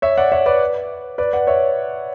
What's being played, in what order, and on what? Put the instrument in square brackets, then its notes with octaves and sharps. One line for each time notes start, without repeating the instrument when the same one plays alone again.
[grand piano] C#5 E5
D5 F#5
C#5 E5
B4 D5
B4 D5
D5 F#5
C#5 E5